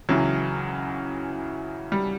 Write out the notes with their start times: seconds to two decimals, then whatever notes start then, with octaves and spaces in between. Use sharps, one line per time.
0.09 C#2 C#3 E3 F#3
1.92 G3